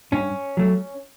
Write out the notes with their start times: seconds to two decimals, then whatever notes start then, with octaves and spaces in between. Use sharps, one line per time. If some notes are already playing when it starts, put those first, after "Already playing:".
0.12 G2 C#4
0.57 F#3 A3